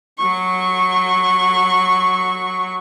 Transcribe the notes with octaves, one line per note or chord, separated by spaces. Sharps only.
F#3 C#6